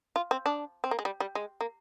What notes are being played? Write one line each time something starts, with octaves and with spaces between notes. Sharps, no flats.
F4
C4
D4
C4
A#3
G#3
G3
G3
G#3
A#3